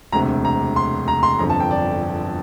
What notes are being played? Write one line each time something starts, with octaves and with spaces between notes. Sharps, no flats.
E1 D2 C3 A#5
A#5
C6
A#5
C6
G1 F2 D3 A#5
A5
G5
D5